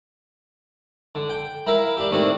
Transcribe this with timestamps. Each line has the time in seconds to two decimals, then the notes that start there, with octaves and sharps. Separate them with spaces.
1.15 D3
1.29 G5
1.67 E4 A#4 E5 F5
1.97 D4 G4
2.11 D#3 A3 C4 D4 E4